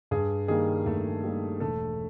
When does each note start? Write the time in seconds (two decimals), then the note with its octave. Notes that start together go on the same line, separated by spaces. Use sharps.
0.11 G2 G#4
0.48 D#3 G3 A#3 G#4
0.86 G2 A3 A4
1.24 D#3 G3 A#3
1.60 E1 A3 A4